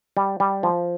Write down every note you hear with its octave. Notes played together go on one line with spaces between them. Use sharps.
G3
G3
F3